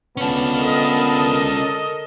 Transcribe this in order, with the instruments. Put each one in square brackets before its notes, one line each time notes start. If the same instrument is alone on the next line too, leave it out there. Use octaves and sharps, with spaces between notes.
[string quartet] D3 A5 [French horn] B3 [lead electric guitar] C#4 F4
[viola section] A4 A#4 D#5